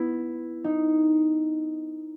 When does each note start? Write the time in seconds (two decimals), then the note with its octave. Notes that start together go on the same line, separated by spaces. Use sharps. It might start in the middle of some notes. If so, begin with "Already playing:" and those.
Already playing: B3 E4
0.64 D#4